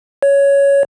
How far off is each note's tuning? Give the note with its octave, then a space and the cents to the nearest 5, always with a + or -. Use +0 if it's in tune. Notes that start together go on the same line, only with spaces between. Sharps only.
C#5 +10